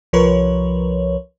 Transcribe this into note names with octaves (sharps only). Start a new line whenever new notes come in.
C2 F3 A#4 B4 C#5